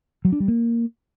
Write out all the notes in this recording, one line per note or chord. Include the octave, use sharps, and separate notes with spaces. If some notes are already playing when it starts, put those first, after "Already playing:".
F#3
D4
G3
A#3